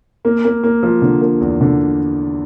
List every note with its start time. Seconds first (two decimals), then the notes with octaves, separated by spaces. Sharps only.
0.25 A#3
0.45 A#3
0.63 A#3
0.83 F3
1.02 D3
1.21 A#3
1.41 E2
1.61 D3